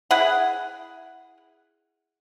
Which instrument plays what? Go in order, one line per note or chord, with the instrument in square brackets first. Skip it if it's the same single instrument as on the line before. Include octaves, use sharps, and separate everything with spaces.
[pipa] E4 G#4 F#5